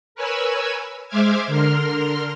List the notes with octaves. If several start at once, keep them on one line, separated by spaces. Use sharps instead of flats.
A#4 B4 C#5 G#5 B5 E6
G#3 C5 E5 D6 F6 G#6
D3 A#4 C6 F6